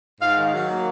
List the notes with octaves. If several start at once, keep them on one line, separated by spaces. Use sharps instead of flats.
G#2 F5
D#3
F#3
A#3